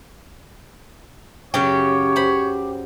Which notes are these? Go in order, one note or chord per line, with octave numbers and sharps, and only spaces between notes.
F#2 C#3 F#3 G4 C#5
C5 B5